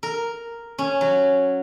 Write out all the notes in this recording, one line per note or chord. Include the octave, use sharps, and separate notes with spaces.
A#4
C#4
F#3